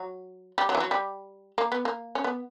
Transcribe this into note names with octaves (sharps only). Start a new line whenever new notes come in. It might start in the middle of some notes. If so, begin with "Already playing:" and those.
Already playing: F#3
G3
F#3
E3
F#3
G3
A#3
B3
A#3
C#4
B3